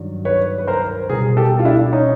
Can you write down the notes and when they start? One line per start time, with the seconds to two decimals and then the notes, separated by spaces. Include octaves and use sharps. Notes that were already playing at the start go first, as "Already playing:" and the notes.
Already playing: G2 D#3 F#3
0.25 B4 C#5
0.58 B4
0.67 A#4 C5
1.09 B2 G3 G#4 A#4
1.37 G4 A4
1.59 F4
1.65 D4 E4
1.92 C#4 D#4